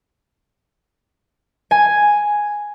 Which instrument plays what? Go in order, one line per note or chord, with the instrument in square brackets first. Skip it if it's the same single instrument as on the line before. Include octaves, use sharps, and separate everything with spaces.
[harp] G#5